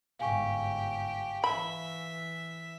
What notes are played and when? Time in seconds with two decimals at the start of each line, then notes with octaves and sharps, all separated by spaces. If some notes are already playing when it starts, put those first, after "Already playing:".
0.19 G1 G#2 G4 F5 G#5 C#6
1.44 E3 E5 B5